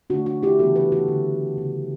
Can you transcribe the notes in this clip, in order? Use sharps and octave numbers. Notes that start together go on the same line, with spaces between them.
D3 A3 D4 F#4
D4 F#4
E4 G4
C#3 E3 B3 F#4 A4
G4 B4
F#4 A4
D3 A3
C#3 F#3 B3